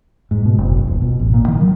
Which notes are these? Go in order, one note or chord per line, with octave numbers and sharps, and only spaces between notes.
G#2
B2
F#1
B1
D#1
B2
A1
A#2
D#3
F#3